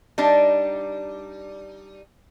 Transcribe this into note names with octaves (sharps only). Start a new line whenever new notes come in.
G3 D4 D#4